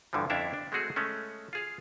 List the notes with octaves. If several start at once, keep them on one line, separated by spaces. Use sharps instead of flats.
D2 G2 D3 E3 F3
F2 C#4 D4 E4 E5 F5
D4
G#3 A3 C4 F#4 G#4
G#3 A3 C#4
F4 G#4 F5